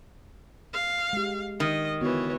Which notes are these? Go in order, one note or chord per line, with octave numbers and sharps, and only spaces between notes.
F5
G#3 G4
D#3 D#5
D3 E3 B3 F#4 C#5